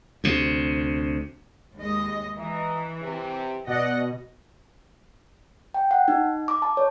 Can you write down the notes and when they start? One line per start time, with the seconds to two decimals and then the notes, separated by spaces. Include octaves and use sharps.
0.24 D2 C3
1.76 D#2 G#3 D#5
2.37 E3 D#5 E5 A#5
3.02 C3
3.67 B2 D5 D#5 F#5
5.74 G5
5.91 F#5
6.08 D#4
6.48 D6
6.62 A5
6.77 C#5